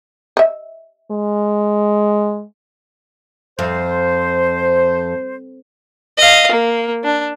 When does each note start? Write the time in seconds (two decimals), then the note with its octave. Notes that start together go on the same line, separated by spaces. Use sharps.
0.37 D#5 E5
1.11 G#3
3.59 F2 C5
6.18 D#5 F5
6.51 A#3
7.04 D4